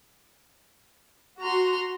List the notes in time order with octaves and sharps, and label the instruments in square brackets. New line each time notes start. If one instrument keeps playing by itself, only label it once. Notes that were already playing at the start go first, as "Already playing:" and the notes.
[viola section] F#4 [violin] A#5 C6